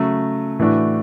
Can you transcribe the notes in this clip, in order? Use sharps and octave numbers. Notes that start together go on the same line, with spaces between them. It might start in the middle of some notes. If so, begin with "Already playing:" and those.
Already playing: C#3 F#3 A3
A2 E3 A3 D4 F#4